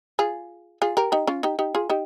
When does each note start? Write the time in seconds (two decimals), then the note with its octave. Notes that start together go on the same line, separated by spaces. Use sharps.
0.19 F4 G#4
0.82 F4 G#4
0.97 G4 A#4
1.12 D#4 G4
1.27 C#4 F4
1.43 D#4 G4
1.59 D#4 G4
1.75 F4 G#4
1.89 D#4 G4